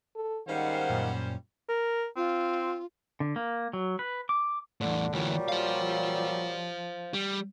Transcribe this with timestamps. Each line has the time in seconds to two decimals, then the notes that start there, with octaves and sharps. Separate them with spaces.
0.15 A4
0.47 G#2 D#3 G3 C#4 C5 F5 F#5
0.90 F#2 A#2
1.69 A#4
2.16 C4 F4
3.20 D3
3.36 A#3
3.73 F#3
3.99 B4
4.29 D6
4.81 E2 A2 D3
5.13 D2 A#2 E3 F#3 G3
5.48 C5 F5
7.14 G3